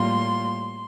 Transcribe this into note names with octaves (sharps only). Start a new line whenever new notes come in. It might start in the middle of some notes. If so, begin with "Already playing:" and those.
Already playing: A2 G3 A#3 F4 C6